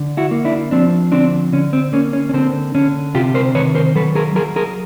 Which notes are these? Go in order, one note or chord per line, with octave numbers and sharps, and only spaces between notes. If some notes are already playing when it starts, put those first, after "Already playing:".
Already playing: D3
E4 F#4
A#3
D4 E4
F3 C4 D4
D3 C4 D4
D3 C#4
C4
A#3 C#4
C#4
C#4
D3 C4
D3 C#4
C3 F4 G4
A#4 C5
D#3 B4 C#5
A#4 C5
F#3 A4 B4
G#4 A#4
F#3 G#4 A#4
G#4 A#4